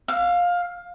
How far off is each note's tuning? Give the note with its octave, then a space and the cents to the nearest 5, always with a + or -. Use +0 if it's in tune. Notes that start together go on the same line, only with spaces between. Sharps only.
F5 +15 E6 +40